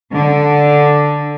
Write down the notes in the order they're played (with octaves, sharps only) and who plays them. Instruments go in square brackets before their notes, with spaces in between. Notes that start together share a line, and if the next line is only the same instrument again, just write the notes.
[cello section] D3